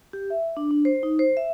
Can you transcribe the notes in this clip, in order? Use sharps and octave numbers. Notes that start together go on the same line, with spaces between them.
G4
E5
D4
D4
C5
D#4
C5
E5